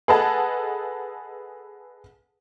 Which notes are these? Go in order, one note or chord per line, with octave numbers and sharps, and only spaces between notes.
G#4 A4 B4 D#5 F#5 A5